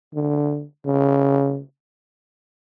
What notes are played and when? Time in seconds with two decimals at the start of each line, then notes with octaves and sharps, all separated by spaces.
0.14 D3
0.86 C#3